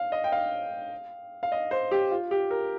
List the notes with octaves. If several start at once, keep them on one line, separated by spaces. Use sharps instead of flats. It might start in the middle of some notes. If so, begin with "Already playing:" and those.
Already playing: F5
D#5
G5
F5
F5
D#5
C5
G4
F4
G4
A#4